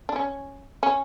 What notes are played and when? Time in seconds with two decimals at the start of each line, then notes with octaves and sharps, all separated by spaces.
0.09 D4
0.16 C#4
0.83 C#4